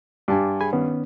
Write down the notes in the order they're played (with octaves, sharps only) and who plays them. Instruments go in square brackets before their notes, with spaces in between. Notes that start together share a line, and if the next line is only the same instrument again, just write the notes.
[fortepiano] G2 [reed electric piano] G#5 A5 D6
[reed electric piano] G#4 G#5 B5
D#3 B3 C#4